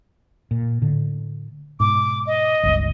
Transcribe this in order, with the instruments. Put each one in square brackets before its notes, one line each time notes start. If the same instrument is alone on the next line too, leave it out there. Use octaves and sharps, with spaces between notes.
[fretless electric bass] A#2
A2 D3
[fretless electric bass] G#2 B2 [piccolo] D6
[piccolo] D#5
[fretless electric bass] G1 C#2